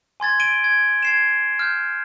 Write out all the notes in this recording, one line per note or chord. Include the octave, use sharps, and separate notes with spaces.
G#5 C6 G#6 A6
D7 D#7 G7
G#6
G#6 C7 E7
F6 G6